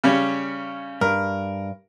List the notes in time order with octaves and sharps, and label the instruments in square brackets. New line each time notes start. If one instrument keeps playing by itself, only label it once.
[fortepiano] C#3 G3 C#4
[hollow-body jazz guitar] G2 [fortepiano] A#4